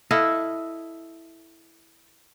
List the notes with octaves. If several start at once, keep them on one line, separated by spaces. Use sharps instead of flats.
E4 A4 D#5 F5